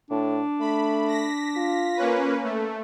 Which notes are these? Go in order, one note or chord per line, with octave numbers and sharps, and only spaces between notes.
A2 D4
A3 B5
A#6 B6
F4
A#3 C#4 B4
A3